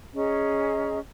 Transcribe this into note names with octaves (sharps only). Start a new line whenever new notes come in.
C#4 G#4 D#5 A#5